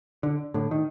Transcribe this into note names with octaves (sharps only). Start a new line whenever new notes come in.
D3
A2 D3
D#3